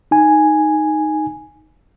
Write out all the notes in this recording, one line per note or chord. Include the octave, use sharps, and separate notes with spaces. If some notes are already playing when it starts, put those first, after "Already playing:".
D#4 G#5